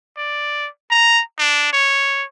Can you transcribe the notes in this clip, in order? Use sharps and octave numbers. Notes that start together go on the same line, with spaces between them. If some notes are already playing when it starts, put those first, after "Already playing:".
D5
A#5
D4
C#5